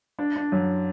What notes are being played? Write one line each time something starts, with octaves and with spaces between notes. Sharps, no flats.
D4
D4
F#2